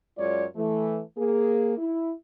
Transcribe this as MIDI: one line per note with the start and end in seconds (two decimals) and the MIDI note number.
0.18 0.45 42
0.18 0.45 56
0.18 0.45 65
0.18 0.45 73
0.18 0.45 74
0.56 1.00 52
0.56 1.00 57
1.18 1.75 58
1.18 1.75 68
1.78 2.12 64